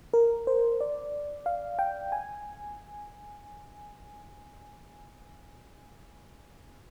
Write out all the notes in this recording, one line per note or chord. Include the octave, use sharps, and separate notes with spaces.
A#4
C5
D5
F5
G5
G#5